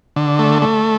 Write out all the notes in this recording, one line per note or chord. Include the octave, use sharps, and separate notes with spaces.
D3
A3
A3